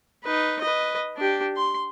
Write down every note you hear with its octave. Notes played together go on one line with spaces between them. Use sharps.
D#4 B4
B4 D#5
D4 G4
C6